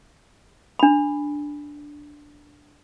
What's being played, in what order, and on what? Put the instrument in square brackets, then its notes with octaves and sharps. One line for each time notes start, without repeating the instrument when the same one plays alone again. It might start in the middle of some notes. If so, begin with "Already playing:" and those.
[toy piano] D4 B5